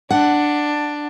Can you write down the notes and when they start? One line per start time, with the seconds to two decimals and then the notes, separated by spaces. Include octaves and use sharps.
0.10 D4 F#5